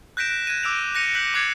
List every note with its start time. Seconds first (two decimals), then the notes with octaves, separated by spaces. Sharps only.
0.17 F#6 G6 A#6 B6 D7 E7
0.47 F#6 G#6 A#6 D#7
0.63 D6 E6 D7 F7
0.95 F#6 A#6 C#7 D#7 F7
1.15 F#6 G6 B6 F#7
1.34 D6 F#6 G#6 A6 C7 C#7